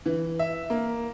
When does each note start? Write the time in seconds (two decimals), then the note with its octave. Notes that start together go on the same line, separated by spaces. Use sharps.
0.06 E3
0.39 E5
0.70 A#3